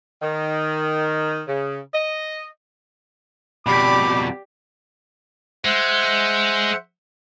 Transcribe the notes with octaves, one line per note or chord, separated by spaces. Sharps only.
D#3
C#3
D#5
F2 B2 G4 D5 B5 D6
G#3 C5 E5 F#5